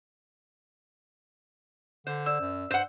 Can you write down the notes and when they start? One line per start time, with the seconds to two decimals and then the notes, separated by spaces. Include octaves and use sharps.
2.07 D3 C5
2.26 D5 E6 E7
2.40 F#2
2.71 G2 C5 F#5